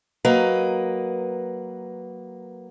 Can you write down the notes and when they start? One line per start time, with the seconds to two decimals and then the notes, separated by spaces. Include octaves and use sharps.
0.25 F#3 A#3 B4 D#5